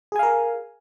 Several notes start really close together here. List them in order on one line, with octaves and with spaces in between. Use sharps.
G#4 G#5 F5 A#4